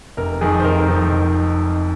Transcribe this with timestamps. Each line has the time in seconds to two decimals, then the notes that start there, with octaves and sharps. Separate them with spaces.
0.17 F1 A#4
0.41 F2 D#3 G#4
0.59 C5
0.64 F1 A#4
0.88 F2 D#3 C5
1.12 F1